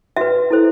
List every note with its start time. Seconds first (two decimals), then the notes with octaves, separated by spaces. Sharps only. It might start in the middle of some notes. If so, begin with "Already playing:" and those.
0.17 F#4 B4 E5
0.50 E4 A4 C5